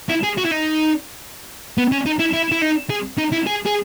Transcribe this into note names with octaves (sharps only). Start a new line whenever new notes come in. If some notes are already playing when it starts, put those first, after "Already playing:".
E4
G#4
F#4
E4
D#4
B3
C#4
D#4
E4
E4
E4
D#4
G#4
D#4
E4
G#4
G#4